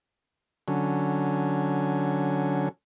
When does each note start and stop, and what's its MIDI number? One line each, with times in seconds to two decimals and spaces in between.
0.68 2.69 50
0.68 2.69 54
0.68 2.69 61